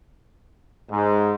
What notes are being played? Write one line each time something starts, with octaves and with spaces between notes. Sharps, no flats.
G#2